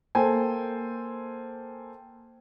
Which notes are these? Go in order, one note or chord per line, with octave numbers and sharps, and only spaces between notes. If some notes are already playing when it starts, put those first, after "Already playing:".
A#3 A4 C5 G5 G#5